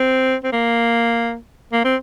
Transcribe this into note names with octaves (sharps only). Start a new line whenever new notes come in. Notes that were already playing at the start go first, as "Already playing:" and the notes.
Already playing: C4
C4
A#3
A#3
C4